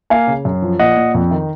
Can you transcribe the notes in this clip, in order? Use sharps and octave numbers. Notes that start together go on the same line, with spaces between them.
A#3 F5 G#5
C#3
F#2
F3
A#2 D#5 F#5
A#2
F2
D#3